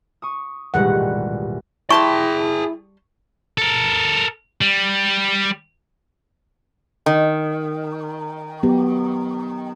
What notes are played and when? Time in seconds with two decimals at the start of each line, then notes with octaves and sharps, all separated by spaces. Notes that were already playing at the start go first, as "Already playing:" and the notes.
0.22 C#6 D#6
0.74 D#1 A1 B2 G3 G#3 F#5
1.90 G3 E4 G#4 G5 A5 C6 C#6
3.58 A4 A#4
4.61 G3
7.06 D#3
8.63 F#3 B3 G4